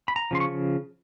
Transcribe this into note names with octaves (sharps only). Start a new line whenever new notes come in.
B5
A#5
C#3 F3 C6
C#6